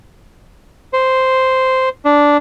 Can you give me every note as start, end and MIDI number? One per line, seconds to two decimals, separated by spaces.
0.93 1.89 72
2.05 2.37 62